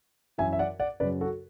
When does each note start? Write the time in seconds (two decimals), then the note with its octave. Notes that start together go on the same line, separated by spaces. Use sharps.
0.38 F#2 E3 E5 G#5
0.53 E5
0.59 D5 F#5
0.80 D5 F#5
1.00 F#2 C#3 F#3 B4 D5
1.21 F#4 A4